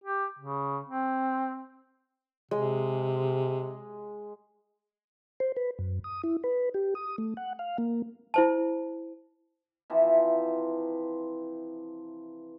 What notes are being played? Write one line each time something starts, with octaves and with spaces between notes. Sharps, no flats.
G4
C#3
C4
C3 G#3
C5
B4
F#2
D#6
E4
B4
G4
D#6
A3
F#5
F5
A#3
E4 C5 A5
C3 E3 F3